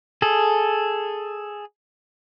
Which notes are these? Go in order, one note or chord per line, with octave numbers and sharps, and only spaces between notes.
G#4 A4